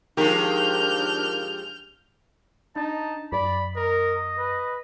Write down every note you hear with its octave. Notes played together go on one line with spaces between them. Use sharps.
D#3 F3 G#3 D4 G4 A#4 F6 G6
D4 D#4 A5
F#2 D5 B5
A#4 D#5
B4